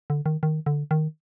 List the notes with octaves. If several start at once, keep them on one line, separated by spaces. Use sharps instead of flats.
D3
D#3
D#3
D3
D#3